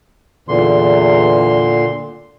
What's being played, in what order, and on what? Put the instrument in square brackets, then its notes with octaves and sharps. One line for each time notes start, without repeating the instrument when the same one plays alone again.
[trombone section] E2 [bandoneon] A#2 D3 C6